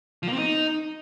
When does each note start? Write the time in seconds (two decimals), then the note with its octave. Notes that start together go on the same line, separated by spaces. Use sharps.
0.23 F3
0.28 A#3
0.33 C4
0.38 D#4